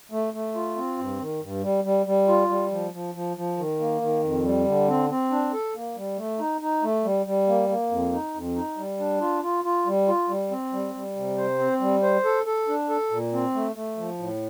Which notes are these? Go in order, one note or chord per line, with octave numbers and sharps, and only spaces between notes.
A3
A3
F4
C4
G2
D#3
G2
G3
G3
G3
F4
G3
F3
F3
F3
F3
D#3
A#3
D#3
F2
G3
D3
C4
C4
D4
A4
A#3
G3
A3
D#4
D#4
A3
G3
G3
A#3
A#3
F2
D#4
F2
D#4
G3
D4
F4
F4
F4
G3
F4
G3
C4
G3
G3
C3
C5
C4
G3
C5
A4
A4
D4
A4
A#2
C4
A3
A3
F3
A2